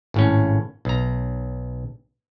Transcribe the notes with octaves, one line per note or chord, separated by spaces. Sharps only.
G#1 A2 C#4
B1 A#5